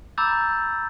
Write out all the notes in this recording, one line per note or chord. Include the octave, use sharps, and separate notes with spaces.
A#5 B5 D6 E6 G6 A6